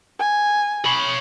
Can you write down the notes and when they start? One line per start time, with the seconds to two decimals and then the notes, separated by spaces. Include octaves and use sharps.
0.19 G#5
0.86 C#5 B5